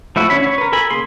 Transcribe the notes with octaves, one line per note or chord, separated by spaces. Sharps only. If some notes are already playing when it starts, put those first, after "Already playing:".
F3 A3 E4 F#4
D3 C#4 E4 C#5 B5
C#5
A#4 B4
A4 A#4 G#5 B5
C#3 A#3 G#4 C6